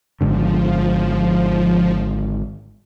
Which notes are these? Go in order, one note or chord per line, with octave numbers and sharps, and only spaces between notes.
G#1 G#2 D3 F3